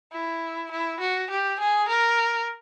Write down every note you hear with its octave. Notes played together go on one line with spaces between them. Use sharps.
E4
E4
F#4
G4
G#4
A#4